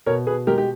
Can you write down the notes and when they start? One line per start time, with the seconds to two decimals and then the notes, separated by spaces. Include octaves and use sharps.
0.06 B2 A#4 C#5
0.27 B2 G#4 B4
0.47 G#3 G4 A#4
0.58 G4